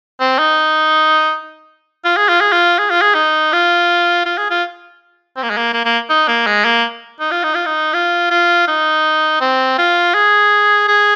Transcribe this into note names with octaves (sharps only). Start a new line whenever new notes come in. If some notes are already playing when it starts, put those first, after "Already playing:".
C4
D#4
F4
G#4
F4
G#4
F4
G#4
F4
G#4
D#4
F4
F4
G#4
F4
C4
A#3
G#3
A#3
A#3
A#3
D#4
A#3
G#3
A#3
D#4
F4
D#4
F4
D#4
F4
F4
D#4
C4
F4
G#4
G#4